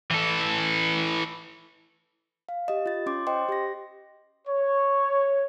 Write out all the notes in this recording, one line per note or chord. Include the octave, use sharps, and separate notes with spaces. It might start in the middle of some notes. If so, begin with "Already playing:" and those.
E3 A4
F5
G4 D#5
F4 A6
C#4 C6 D6
C5 D#5 G5 C6
G4 A#6
C#5